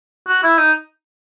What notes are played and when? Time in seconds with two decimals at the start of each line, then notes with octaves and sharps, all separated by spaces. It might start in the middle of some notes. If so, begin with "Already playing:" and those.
0.28 F#4
0.43 E4
0.58 D#4